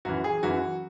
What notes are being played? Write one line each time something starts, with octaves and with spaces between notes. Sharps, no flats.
F#2 E3 F#4
G#4
F#2 E3 F#4